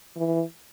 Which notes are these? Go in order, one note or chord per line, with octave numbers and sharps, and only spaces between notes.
E3